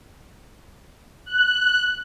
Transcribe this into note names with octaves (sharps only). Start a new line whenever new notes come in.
F#6